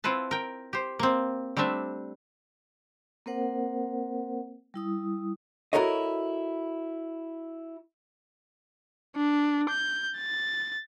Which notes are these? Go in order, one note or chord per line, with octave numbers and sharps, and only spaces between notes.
C4 E4 F4 B4 A5
A#4 G5
G4 C5
A#3 C4
G3 A3 C4 D4 E5
A#3 C4 A#4 C5 F#5
G3 E4 D#6
E4 F#4 A4 A#4 C#5 D#5
D4
G6
A6